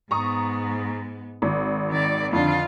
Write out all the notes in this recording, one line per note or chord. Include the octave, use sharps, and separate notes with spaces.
G#2 B3 A#5 C#6 D#6
G#1
D#3 D5
F2 D3 F4